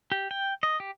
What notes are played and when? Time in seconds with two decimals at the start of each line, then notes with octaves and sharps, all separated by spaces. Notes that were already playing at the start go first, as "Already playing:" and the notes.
0.12 G4
0.31 G5
0.63 D#5
0.80 G4